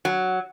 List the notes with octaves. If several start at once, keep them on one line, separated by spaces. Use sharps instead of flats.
F#3